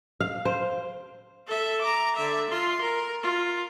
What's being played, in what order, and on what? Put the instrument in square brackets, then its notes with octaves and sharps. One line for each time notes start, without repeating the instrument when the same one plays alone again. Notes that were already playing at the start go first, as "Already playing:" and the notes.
[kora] F5
C5
[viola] A4 E5
A#5 D6
D3 E5
F4 C6
A#4
F4